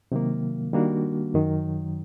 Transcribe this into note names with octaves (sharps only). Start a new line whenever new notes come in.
C3 D#3 F#3 A#3
D#3 G3 A#3 D4 F#4
F#2 D#3 F#3